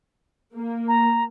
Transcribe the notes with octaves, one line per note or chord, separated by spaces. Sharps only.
A#3
A#5